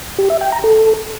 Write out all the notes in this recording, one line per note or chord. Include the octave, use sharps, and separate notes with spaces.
G4
E5
G5
A#5
A4